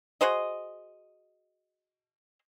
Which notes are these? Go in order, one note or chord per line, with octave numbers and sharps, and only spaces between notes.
F#4 G#4 C5 D#5